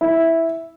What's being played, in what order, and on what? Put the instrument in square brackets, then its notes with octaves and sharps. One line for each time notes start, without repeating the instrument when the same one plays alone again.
[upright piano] E4